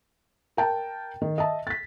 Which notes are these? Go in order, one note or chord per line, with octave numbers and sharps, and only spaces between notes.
A#4 G5 A5
D#3
D#5 E5 A5
A6 B6